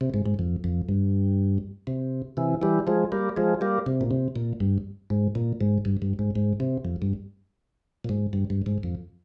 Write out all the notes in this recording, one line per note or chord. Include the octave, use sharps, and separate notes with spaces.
C3
G#2
G#2
F2
F2
G2
C3
C3 E3
E3 G3
F3 G#3
G3 A#3
F3 G#3
G3 A#3
C3
A#2
C3
A#2
G2
G#2
A#2
G#2
G2
G2
G#2
G#2
C3
F2
G2
A#2
G#2
G2
G2
G#2
F2